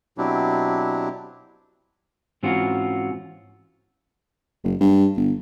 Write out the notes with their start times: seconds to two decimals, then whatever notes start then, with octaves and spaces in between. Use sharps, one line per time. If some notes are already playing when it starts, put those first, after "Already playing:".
0.18 B2 F#3 C4 D4 E4 G4
2.43 G#2 E3 C4 C#4 F4 F#4
4.64 F#1
4.80 G2
5.17 G1